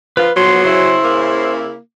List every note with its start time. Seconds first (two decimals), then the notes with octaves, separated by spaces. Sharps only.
0.17 F3 F4 B4
0.37 D2 F3 F#3 B3 C6
0.65 C#3 E4 C5
1.04 A#3